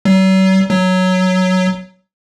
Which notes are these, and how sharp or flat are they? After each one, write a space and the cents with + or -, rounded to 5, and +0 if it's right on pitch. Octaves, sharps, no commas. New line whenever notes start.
F#3 +45
F#3 +0